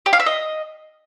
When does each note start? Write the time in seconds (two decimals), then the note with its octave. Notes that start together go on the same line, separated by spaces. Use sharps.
0.06 G4
0.13 F5
0.20 E5
0.26 D#5